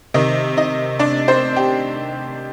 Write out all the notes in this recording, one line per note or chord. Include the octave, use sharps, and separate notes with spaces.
C3 D#3 D#4 D#5
D#4 D#5
D4 D5
C4 C5
G4